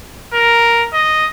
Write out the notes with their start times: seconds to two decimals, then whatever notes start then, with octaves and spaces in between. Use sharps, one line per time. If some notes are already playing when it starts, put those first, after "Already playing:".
0.33 A#4
0.93 D#5